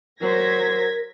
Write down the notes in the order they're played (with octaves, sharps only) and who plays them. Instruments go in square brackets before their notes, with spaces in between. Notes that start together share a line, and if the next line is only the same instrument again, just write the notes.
[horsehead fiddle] F#3 C5 [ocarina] A#4 [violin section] G#6 A#6 B6